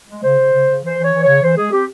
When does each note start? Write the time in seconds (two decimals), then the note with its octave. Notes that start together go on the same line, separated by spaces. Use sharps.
0.09 G#3
0.24 C#3 C5
0.39 C#3
0.54 C#3
0.68 C#3
0.84 E3 C5
0.98 E3
1.04 C#5
1.13 E3
1.23 C#3 C#5
1.43 E3 C5
1.57 G#3 G#4
1.72 C4 G4